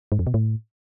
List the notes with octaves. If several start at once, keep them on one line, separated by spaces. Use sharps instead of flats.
G#2
F2
B2
A2